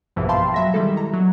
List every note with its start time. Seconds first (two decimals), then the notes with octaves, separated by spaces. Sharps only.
0.16 A#1 E2 G2 B2 E3 F3
0.29 E5 F5 G5 A5 B5 C6
0.54 F#3 E5 A#6
0.74 D#3 G3 G#3 E4 A4
0.97 A#5
1.14 F#3